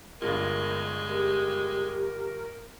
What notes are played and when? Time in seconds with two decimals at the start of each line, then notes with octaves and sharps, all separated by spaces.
0.22 G1 G2 G#3 F4 A#4
1.08 G4 A#4